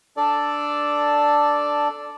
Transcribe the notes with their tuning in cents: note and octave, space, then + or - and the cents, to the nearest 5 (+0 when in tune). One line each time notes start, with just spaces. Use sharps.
D4 +0 A4 +0 D5 +0